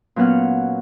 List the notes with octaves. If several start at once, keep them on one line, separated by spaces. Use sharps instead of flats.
A#2 F#3 B3 C#4 F#5 F6